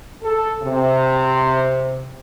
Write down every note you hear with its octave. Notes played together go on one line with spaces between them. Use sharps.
A4
C3